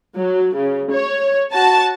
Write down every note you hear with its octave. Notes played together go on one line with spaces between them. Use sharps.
F#3
C#3
C#5
F#4 A5